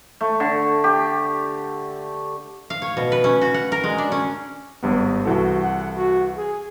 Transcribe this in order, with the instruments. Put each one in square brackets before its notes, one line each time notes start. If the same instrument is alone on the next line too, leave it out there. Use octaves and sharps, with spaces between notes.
[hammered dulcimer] A3
D3
G4
[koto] F5
C#5
B2
B4
C#4
F#4
F#5
A#4
G#3
D4
C#4
[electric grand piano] G#1 G2 B3
[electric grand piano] C2 E3 A4 [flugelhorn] F#4
[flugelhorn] F#5
F#4
G#4